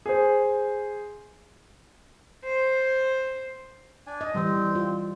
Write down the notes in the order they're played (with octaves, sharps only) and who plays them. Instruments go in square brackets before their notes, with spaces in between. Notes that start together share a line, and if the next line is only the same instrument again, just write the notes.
[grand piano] G#4 C5
[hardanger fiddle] C5
[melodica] D4 G#5
[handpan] D#5
[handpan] E3 G3 [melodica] C4
[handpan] F4